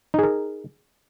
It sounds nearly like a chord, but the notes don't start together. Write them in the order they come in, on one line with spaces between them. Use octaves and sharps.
D#4 G#4 A#4